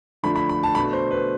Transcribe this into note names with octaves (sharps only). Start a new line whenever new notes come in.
D3 F3 A3 D4 B5
B5
B5
A5
B2 A3 D4 B5
C5
B4